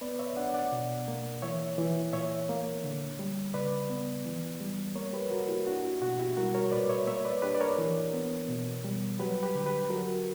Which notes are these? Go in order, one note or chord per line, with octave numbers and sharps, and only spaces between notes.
B3 B4 D5
C#5 E5
D4 D5 F#5
D5 F#5
B2
A#3
E3 C#5 E5
E3
A#2 C#5 E5
A#3
D3
G3
C#3 B4 D5
B3
E3
G3
A#3 A#4 C#5
G4 B4
A#3 F#4 A#4
E4 G4
D4 F#4
E4
B2 F#4
E4 G4
G3 F#4 A#4
A#4 C#5
A#2 B4 D5
C#5 E5
A#3 C#5 E5
B4 D5
D4 G4 B4
D5
A#4 C#5
E3
B3
B2
G3
F#3 G4 B4
G4 B4
D3
G4 B4
F#3 F#4 A#4